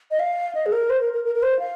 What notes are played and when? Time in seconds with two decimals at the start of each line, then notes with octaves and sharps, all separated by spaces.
0.11 D#5
0.20 F5
0.55 D#5
0.66 G#4
0.72 A#4
0.90 C5
1.01 A#4
1.13 A#4
1.24 A#4
1.35 A#4
1.42 C5
1.59 F5